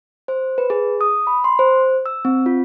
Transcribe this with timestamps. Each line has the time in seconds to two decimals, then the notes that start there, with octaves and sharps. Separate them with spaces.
0.28 C5
0.58 B4
0.70 G#4
1.01 D#6
1.27 B5
1.44 C6
1.59 C5
2.06 E6
2.25 C4
2.46 F4